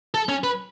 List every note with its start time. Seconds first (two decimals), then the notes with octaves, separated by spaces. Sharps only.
0.14 A4
0.29 C#4
0.44 B4